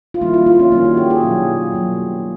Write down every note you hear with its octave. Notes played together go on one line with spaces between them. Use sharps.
F4
D#3 G3 A#3 E4
F4
F4
C#4
D#3 G3 A#3 C#4
F#4
G4
G#4
B2 F#3 A#3
B2 F#3 A#3